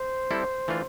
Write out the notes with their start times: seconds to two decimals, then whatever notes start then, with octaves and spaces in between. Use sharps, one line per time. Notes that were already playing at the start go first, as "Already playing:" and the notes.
Already playing: C5
0.31 G3 C4 E4 A4
0.68 E3 A3 D4 F4